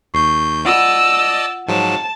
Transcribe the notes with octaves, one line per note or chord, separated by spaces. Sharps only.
D#2 C#6 G6 C7
F4 D5 D#5 F#5 A5 E6
G#2 F3 F#3 A5